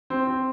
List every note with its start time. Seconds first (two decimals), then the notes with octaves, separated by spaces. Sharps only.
0.10 C4
0.28 C4